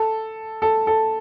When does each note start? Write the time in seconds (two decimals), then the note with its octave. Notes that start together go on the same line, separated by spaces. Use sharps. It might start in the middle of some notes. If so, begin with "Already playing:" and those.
Already playing: A4
0.62 A4
0.87 A4